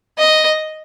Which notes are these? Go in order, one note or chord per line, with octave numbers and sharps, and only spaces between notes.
D#5